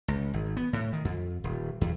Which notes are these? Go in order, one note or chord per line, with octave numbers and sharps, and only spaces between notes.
C#2
G#1
B3
A2
D#3
F2
D#1
E2